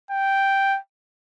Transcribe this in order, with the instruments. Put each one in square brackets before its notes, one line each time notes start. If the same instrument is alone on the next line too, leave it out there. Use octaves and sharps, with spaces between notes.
[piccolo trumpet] G5